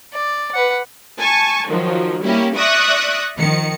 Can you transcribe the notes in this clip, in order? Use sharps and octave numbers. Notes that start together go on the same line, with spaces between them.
D5
B4 F#5
G#5 A5 C#6
D#3 F3 F#3
G3 A#3 C#4 E4 G4
D5 E5 C#6 D#6 F#6 A#6
D#3 F3 C#7